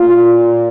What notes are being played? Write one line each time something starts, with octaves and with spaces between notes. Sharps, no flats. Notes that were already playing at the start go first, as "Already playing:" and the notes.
Already playing: A#2 F4